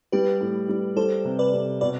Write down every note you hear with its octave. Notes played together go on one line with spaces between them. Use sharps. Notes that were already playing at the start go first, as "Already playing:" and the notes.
G3 G4 B4
A2
G3
G3 A4 C5
C3
B4 D5
C3
B2 B4 D5